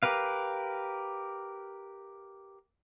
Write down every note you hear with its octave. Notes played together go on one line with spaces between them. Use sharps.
G4 A#4 B4 F5